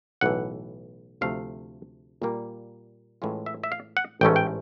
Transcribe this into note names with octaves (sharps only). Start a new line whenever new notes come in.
B1 A2 E3 F#5
D2 C3 F3 A3 F5
A#2 G3 A#3
A2 E3 G#3 C#4 F4
E5
E5
F5
F#5
A1 G#2 E3 A3 C#4 G5
G5